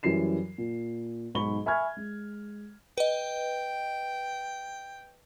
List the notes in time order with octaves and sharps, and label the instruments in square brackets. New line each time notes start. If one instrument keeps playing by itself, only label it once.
[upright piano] F#2 E3 G3 C7 E7
A#2
B1 G#2 B5 C#6 G7
E5 G#5 B5 C#6 F6 G#6
G#3
[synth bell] B4 D#5 [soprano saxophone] G5